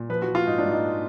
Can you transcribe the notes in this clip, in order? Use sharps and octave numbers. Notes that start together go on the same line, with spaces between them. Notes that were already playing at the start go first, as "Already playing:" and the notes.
Already playing: A#2
F3 B4
F#4
F3
F4
G#2 D#4
D4
G#2
D#4